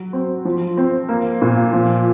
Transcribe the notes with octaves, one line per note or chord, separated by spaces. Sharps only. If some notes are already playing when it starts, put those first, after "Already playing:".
Already playing: F#3
C4
F3
C4
A#3
A#2
F3